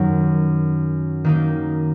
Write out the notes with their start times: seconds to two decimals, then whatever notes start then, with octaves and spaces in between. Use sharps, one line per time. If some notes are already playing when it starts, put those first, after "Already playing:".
Already playing: F#2 D#3 F#3
1.25 D#3 A#3 D#4